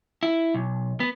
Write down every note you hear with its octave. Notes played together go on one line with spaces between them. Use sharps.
E4
B1
B3